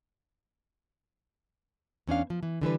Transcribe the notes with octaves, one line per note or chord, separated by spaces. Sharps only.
E2 C#4 D4 F5
F3
E3
D3 E3 G3 B4